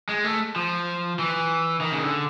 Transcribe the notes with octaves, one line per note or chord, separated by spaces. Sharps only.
G#3
A3
F3
E3
D#3
C#3
D3